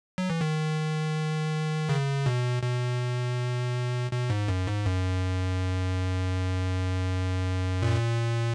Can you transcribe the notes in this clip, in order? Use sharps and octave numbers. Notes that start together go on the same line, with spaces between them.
F#3
E3
D#3
C#3
B2
B2
B2
G#2
F#2
G#2
F#2
A#2